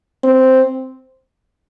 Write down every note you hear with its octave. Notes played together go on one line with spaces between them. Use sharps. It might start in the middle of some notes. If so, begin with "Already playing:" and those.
C4